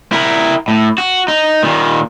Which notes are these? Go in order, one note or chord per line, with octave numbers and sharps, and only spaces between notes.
E4 A#4
A2
F#4
D#4
A#2 D#3